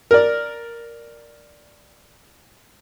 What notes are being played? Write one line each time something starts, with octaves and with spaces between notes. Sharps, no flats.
A#4 D5